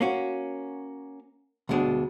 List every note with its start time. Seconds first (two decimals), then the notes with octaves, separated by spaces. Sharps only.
0.01 A#3 C#4 F#4
1.69 D2 G2 B2 G#3 D4